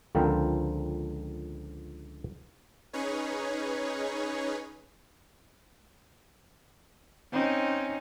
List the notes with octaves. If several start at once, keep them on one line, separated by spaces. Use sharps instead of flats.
C#2 D3 F3 C4 A#4 G5
C#4 D#4 G#4 B4 C#5
C4 C#4 D#4